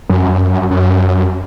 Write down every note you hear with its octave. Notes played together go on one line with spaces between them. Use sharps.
F#2
F#2